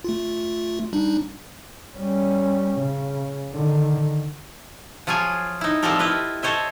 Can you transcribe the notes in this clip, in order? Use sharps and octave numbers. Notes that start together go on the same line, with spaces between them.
A3 F4
G3 D4 D#4
G3 C#4
C#3
D3 D#3
F3 F#3 F4 G#4 G#5
D#4 E4
F3 G3 C4 G4 A4 A#4
E4 F4 B4 D#5
A4 C5 C#5 D#5 E5